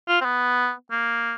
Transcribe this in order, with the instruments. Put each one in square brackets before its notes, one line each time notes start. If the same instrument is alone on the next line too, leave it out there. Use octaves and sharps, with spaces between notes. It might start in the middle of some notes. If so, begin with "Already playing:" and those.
[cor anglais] F4
C4
B3
A#3